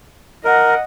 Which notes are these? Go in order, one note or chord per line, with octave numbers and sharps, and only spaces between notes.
A#4 D#5 F#5